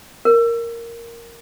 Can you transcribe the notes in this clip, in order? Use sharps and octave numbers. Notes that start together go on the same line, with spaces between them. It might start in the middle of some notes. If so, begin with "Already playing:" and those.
A#4